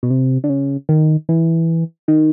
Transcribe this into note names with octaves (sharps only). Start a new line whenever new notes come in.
B2
C3
D3
C#3
D#3
E3
D#3